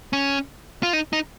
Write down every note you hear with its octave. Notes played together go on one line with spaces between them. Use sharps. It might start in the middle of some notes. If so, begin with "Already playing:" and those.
C#4
F4
D#4
D#4